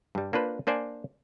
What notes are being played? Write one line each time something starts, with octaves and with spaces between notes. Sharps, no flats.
G2 G3
A#3 D4 F4 B4 C5
A#3 D4 C5 D5 G#5